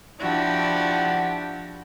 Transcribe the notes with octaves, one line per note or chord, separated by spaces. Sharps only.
F3 D4 E4 F#4 G4